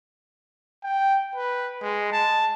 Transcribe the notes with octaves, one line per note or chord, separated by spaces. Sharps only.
G5
B4
G#3
A5